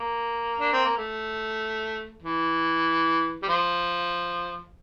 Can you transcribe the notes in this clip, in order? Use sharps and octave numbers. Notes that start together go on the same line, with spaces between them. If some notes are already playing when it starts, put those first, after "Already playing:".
Already playing: A#3
D4
C4
A#3
A3
E3
G3
F3